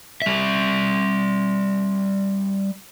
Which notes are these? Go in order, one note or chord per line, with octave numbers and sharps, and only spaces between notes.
G3 E5